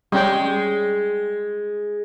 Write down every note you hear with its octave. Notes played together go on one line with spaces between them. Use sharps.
G3 G#3 C#4 G5